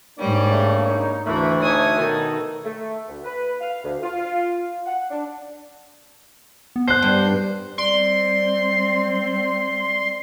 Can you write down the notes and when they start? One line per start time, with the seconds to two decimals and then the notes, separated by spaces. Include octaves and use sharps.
0.18 G#2 G3 A#3 D4 C#5
0.49 C#3 A3
0.89 D#4
1.25 D2 E3 A3
1.62 D#4 E4 C#5 G#5 D#6
1.97 B2 D#3 D#4 A4
2.65 A3
3.08 D2
3.24 B4
3.60 F5
3.83 D2
4.03 F4
4.85 F#5
5.10 D4
6.76 B3
6.88 C5 F#6 C7
7.02 G2
7.78 G3 C4 D5 C6